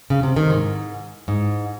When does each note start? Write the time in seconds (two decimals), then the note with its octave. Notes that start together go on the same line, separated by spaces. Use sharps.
0.10 C#3
0.23 C3
0.36 C3 D#3
0.50 G#2
1.28 G#2